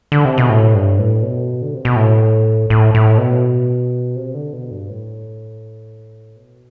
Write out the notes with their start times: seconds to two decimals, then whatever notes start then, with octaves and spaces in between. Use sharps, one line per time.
0.12 D3
0.25 C3
0.38 B2
0.49 A2
0.74 G2
0.99 A2
1.23 B2
1.62 D3
1.74 C3
1.85 B2
1.96 A2
2.70 A2
2.95 A2
3.18 B2
4.16 C3
4.34 D3
4.53 B2
4.71 G2
4.89 A2
6.36 B2